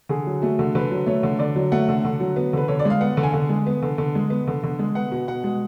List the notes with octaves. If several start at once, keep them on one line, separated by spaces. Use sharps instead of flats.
D3 G#4
F#3
A3 F#4
D3
D3 B4
F#3
A3 C#5
D3
D3 D5
F#3
A3 F#5
D3
D3
F#3
B3
D3 B4
D3 C#5
D5
G#3 F5
B3 F#5
D3
G#5
D3
G#3
B3
D3
D3
G#3
B3
D3
D3
G#3
B3 F#5
B2
B2 F#5
G#3